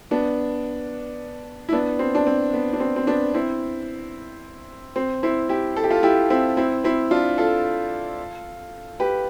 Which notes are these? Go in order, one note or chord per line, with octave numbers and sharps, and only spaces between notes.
B3 D4
E4
B3 D4
C4
D4
C4
B3
D4
C4
C4
B3 D4
C4 E4
C4
C4 E4
E4 G4
A4
G4
F4 A4
E4 G4
C4 E4
C4 E4
C4 E4
D4 F4
F4 A4
G4 B4